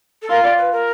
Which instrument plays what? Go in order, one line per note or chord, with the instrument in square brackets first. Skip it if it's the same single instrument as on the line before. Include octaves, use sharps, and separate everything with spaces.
[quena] A4
[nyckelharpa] F4 [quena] A#4
[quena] D5
B4
A#4